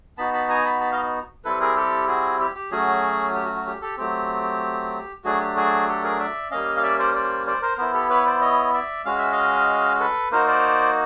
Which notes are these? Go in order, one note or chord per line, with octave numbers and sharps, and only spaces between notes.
B3 D#4 F#4 A5 B5
A5 B5
G#5 A#5
A5 B5
A5 B5
D#5 F5
G3 C4 E4 A4 B4
G#4 A#4
G4 A4
F#4 G#4
G4
G4
F#3 A3 C#4 F#4 G#4
G4
F#4
F#4
G4
G4 A4
F#3 A3 C4 G4
F#3 A3 D4 F#4 G#4
G4
F#4 G#4
G4 A4
G#4 A#4
D5 E5
G3 A#3 C#4 D#5 F5
F5
D5 E5
C5 D5
C5 D5
C5 D5
A#4 C5
B3 E4 A#4 C5
G4 A4
B4 C#5
C5 D5
C#5 D#5
D5 E5
G#3 C#4 F#4 F5
E5
D#5 F5
A4 B4
A#3 D#4 F#4 A#4 C5
C5 D5